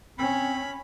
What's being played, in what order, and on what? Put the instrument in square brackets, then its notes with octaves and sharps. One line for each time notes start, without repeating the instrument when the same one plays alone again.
[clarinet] C4 [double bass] C#4 [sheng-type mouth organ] B5